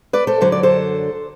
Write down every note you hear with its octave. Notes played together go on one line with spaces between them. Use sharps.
B4 D5
A4 C5
F#2 D3 F#3 C5
D5
A4 C5